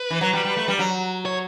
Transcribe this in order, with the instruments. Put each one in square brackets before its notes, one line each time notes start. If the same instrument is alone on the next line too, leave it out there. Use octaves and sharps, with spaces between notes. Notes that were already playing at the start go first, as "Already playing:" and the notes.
Already playing: [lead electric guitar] B4
[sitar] E3
F#3
G3
G3
A3
G3
F#3
[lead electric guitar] C#5